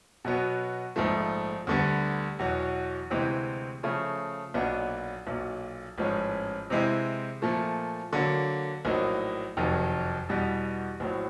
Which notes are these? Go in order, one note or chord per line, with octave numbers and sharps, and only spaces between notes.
B2 F#3 B3
A#1 G#2 F3 A3
D2 D3 G3 B3
E2 B2 F#3
D2 C3 E3 G#3 C4
C#3 F3 A3
B1 A#2 F#3 B3 D4
B1 A#2 F#3
A1 G#2 F3 G#3 C#4
C3 E3 G#3 C4 E4
A#2 F3 A3
D3 F#3 A#3
A#1 A2 F#3 A#3 D#4
F#1 F2 C3 D#3 F#3
E2 B2 G3
A#1 A2 F#3